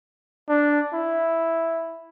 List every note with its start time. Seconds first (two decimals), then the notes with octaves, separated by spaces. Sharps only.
0.49 D4
0.93 E4